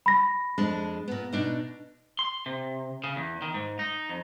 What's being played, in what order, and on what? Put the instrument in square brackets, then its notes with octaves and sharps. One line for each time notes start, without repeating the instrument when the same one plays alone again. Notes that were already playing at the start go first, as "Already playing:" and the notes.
[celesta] B5 A#6
[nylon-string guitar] F2 G#3 D4
A#2 B3
B2 D4 D#4
[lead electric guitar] C6
C3
C#3
E2
D#3
G#2
D#4
F2